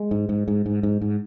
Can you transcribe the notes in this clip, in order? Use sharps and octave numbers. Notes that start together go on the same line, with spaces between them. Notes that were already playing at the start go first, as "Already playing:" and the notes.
Already playing: G#3
G#2
G#2
G#2
G#2
G#2
G#2